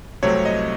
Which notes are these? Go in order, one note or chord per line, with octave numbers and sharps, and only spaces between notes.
C2 C3 F#3 A3 C4 C#5
D#5